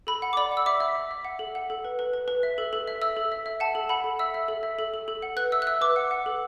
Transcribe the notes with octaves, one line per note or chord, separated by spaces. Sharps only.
A4 B5
F#5
D6
D5 B5
F#5
E6
E5 D6
E5
E5
E5
F#5
A4
F#5
A4
B4
B4
B4
B4
E5
A4
A4
E5
E5 E6
A4
E5
E5
F#5 A5
A4
F#5 B5
A4
E5 E6
E5
A4
E5
A4
A4
A4
F#5
B4 F#6
E5 E6
F#6
E5 E6
B4 D6
F#5
F#5
A4